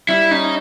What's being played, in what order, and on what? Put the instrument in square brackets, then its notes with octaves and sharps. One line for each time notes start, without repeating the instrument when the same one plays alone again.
[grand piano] G3 [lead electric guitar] E4
[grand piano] C#4 [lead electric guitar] D#4